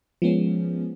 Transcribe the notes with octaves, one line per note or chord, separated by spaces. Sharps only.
F3 G#3 B3 C#4